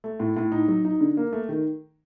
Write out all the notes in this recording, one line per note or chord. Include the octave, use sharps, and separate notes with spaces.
A3
A2
A2
D#4
F#3
D#4
D3
A#3
A3
D#3